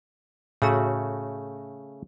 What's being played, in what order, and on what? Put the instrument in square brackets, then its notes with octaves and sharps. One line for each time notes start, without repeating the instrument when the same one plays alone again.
[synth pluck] A2 F#4 [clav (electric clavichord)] C#3 A3